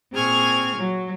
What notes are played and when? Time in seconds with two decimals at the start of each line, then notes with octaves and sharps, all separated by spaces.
0.15 A#2 C4 G#4 C#6 F6 G#6
0.76 F#3